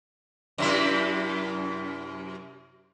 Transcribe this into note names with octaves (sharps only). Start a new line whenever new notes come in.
F#2 C3 E4